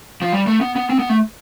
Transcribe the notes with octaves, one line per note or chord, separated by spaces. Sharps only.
F3
G3
A3
B3
B3
C4
B3
A3